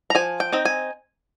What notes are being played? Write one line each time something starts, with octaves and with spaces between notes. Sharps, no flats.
A#5
F3 G#5
G5
C4 D#4
G#5